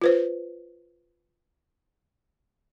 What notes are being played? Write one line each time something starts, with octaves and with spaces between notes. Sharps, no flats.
F4 B4 C5